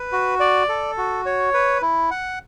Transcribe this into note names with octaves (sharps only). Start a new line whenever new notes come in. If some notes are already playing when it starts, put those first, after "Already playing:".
Already playing: B4
F#4
D5
A4
F#4
C#5
B4
E4
F#5